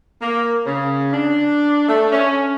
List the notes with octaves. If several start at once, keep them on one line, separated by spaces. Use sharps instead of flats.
A#3
C#3
D4
A3
C#4